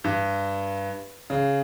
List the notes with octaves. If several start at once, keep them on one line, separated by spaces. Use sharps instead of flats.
G2
C#3